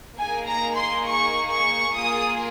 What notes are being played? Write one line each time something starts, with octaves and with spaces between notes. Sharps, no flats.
A#3 D#4 G#4 G#5
A#5
C6
C#6
C#6
A#3 F4 G#4 D#6